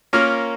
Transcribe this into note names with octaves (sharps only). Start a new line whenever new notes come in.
A#3 C#4 F4 A#4